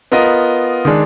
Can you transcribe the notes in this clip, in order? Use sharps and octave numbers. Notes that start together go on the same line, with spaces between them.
B3 F4 A#4 D#5
D#3 G#3 D4